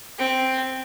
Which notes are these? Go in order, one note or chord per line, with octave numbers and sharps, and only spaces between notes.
C4